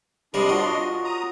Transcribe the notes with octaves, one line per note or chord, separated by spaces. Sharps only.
C3 G3 D4 A#4 D#5 C6
F4 F#4 A#4 C#5
A#5 D#6